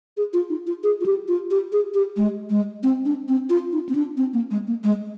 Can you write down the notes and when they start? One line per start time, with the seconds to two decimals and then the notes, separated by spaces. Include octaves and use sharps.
0.17 G#4
0.33 F4
0.50 D#4
0.67 F4
0.83 G#4
1.01 F4
1.06 G4
1.28 F4
1.51 G4
1.72 G#4
1.94 G4
2.17 G#3
2.50 G#3
2.83 C4
3.05 D4
3.28 C4
3.50 F4
3.72 D#4
3.89 C4
3.95 D4
4.17 C4
4.33 A#3
4.51 G#3
4.67 A#3
4.84 G#3